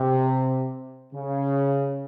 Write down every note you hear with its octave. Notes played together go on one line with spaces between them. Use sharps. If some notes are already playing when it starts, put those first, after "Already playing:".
Already playing: C3
C#3